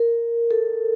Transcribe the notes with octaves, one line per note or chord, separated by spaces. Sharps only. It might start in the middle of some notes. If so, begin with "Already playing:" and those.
Already playing: A#4
A4